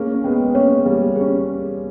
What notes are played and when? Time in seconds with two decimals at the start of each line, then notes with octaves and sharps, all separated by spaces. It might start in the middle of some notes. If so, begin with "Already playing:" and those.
Already playing: A#3 C#4 G#4
0.14 C#4
0.24 G#3 B3 G5
0.55 A#3 C#4 C#5
0.85 G3 A#3 G#4
1.16 G#4
1.21 C#4